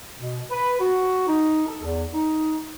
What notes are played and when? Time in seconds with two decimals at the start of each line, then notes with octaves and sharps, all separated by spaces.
0.18 B2
0.51 B4
0.80 F#4
1.27 D#4
1.66 A4
1.83 E2
2.13 D#4